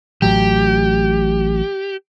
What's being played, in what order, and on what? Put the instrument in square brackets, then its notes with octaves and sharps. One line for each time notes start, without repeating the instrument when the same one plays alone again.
[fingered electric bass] A1 A2 F#3 [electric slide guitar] G4